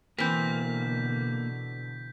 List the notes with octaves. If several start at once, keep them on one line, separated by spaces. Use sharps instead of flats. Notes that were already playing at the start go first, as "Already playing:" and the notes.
B2 D3 E3 A#3 C4 G6 B6